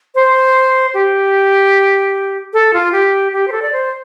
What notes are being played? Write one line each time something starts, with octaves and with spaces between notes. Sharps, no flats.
C5
G4
A4
F4
G4
G4
C5
A4
D5
C5